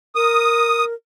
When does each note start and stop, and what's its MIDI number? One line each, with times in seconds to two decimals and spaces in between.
0.15 0.93 70
0.15 0.85 87